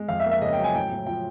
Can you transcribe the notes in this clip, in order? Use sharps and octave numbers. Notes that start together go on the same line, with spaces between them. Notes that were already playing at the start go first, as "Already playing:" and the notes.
Already playing: G#3
F2 F5
E5
A#3
E5
C#3 D#5
G5
F#3
G#5
A2 G5
A2
F3 G5